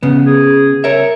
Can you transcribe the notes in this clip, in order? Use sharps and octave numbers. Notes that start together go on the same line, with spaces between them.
C#3 B3
G#4
A#4 C#5 E5